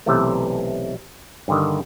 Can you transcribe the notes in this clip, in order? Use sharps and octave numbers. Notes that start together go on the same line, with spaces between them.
B1 C3 E3 A3
G2 D3 D#3